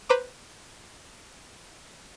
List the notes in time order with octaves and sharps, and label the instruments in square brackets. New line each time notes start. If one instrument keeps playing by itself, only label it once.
[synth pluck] B4 C5 A#5 D6